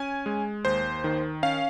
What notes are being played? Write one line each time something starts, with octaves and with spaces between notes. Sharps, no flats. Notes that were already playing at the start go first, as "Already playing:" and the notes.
Already playing: C#4 G#5
G#3
D#2 C5
D#3
C#4 F5